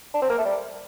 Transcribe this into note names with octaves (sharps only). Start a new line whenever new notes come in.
D4
C4
A#3
A3
G3